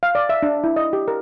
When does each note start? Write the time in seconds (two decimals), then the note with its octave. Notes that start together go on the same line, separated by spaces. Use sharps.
0.03 F5
0.15 D5
0.29 E5
0.43 D4
0.64 E4
0.76 D#5
0.93 G4
1.08 A#4